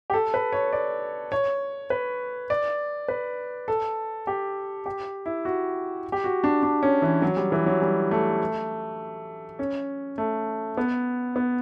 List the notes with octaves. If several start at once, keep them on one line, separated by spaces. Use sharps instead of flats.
G4
A4
B4
C#5
D5
C#5
B4
D5
B4
A4
G4
G4
E4
F#4
G4
F#4
D4
D4
C#4
E3
F#3
G3
E3
F#3
G3
A3
C#4
A3
B3
B3